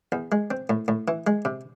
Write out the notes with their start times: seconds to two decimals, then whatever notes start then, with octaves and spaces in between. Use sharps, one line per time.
0.12 E2
0.32 G#3
0.51 C4
0.70 A2
0.88 A2
1.08 E3
1.27 G#3
1.45 C3